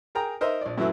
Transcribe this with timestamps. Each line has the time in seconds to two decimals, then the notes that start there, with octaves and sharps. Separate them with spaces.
0.15 G#4 A#4 G5 A#5
0.41 D#4 A#4 C5 D#5 E5
0.61 A#1 D5
0.78 F#2 E3 F#3 A3 F#4 E5